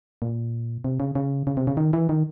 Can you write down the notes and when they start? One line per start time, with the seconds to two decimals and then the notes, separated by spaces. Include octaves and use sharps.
0.22 A#2
0.84 C3
1.00 C#3
1.15 C#3
1.47 C#3
1.57 C3
1.67 C#3
1.77 D#3
1.93 E3
2.09 D#3